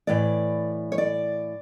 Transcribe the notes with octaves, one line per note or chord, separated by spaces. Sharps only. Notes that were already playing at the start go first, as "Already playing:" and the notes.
A2 E3 D5
C#5
D5